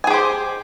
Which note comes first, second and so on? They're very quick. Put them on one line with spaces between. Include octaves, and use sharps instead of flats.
G#5 G#4 G4 C5